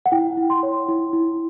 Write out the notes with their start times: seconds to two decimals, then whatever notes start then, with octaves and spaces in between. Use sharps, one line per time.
0.06 F#5
0.12 E4 G5
0.37 E4
0.50 C6
0.63 C#5
0.88 E4
1.13 E4